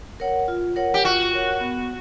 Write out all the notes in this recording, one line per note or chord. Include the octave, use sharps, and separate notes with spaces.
A#4 C#5 F#5
F4
A#4 C#5 F#5
G4
F4 F#4
A#4 C#5 F#5
B3